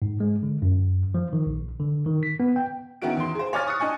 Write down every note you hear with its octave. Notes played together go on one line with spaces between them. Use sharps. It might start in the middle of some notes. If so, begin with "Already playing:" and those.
G#2
G#3
D3
F#2
F3
D#3
A#1
D3
D#3
B6
B3
G5
D#3 B3 C#4 E4 F#4 D7
E2 C6
G#4 C5
C#5 G#5 D6 F6 A6
C#6 D#6 F#6 C#7
D4 D#5 G#5 C#6